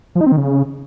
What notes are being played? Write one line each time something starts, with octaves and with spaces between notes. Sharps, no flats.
F3
D#4
C4
D#3
C#3